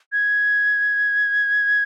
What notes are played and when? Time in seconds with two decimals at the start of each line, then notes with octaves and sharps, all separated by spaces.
0.12 G#6